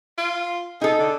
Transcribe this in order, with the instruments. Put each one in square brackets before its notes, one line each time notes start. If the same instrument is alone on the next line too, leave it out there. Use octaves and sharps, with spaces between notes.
[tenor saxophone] F4
[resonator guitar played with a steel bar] D#4 A4 [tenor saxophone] G#4
[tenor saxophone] D3